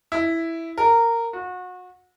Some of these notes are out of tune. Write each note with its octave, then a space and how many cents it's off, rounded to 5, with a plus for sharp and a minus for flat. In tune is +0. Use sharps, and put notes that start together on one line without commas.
E4 +0
A#4 -15
F#4 -30